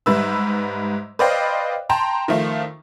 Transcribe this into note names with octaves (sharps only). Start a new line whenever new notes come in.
G#2 G3 B4 E5 E6
B4 C5 D5 D#5 F5 G5
G5 A5 A#5 C6
D#3 F3 A3 F4